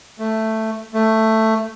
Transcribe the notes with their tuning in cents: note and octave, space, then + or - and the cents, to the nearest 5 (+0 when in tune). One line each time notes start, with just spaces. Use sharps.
A3 +5
A3 +10